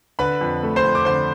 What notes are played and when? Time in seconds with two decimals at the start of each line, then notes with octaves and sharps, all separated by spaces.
0.19 D3 B4 B5
0.41 F2
0.63 A3
0.76 C5 C6
0.84 F2
0.95 D6
1.05 D3 C5 C6